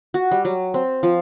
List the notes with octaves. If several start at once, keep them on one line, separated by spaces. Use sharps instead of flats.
F#4
G3
F#3
C4
F3